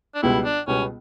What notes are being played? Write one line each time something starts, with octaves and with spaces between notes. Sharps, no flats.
D4
C#2 B2 G3 B3 E4
D4
C#2 B2 G3 B3 C#4